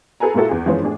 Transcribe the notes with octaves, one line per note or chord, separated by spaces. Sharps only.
G#4 A4 B4 G#5 A#5
A#2 G#3 A#3 E4 F#4 A4
E2 G#4
F#1 E3 F3 G#3 C#4 C5
A2 D4 G#4